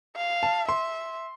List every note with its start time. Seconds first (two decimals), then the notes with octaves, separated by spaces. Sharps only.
0.16 F5
0.43 A5
0.69 E5 C6